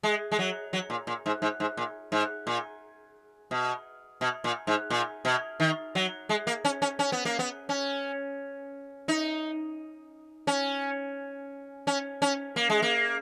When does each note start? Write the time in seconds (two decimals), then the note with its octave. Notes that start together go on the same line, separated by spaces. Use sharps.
0.03 G#3
0.32 G#3
0.39 F#3
0.73 F#3
0.90 A#2
1.07 A#2
1.26 G#2
1.42 G#2
1.60 G#2
1.77 A#2
2.12 G#2
2.47 A#2
3.51 B2
4.21 B2
4.44 A#2
4.67 G#2
4.90 A#2
5.25 B2
5.60 D#3
5.95 F#3
6.29 G#3
6.47 A#3
6.65 C#4
6.82 C#4
6.99 C#4
7.12 B3
7.25 A#3
7.39 B3
7.69 C#4
9.08 D#4
10.47 C#4
11.87 C#4
12.22 C#4
12.56 A#3
12.70 G#3
12.82 A#3